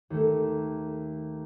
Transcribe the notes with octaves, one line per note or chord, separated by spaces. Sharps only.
D#2 A3